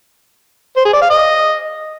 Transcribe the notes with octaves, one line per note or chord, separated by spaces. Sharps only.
C5
G#4
D5
F5
D#5